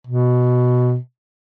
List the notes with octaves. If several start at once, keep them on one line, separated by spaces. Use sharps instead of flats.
B2